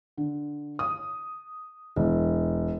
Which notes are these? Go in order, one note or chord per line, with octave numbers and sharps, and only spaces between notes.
D3
D#6
E1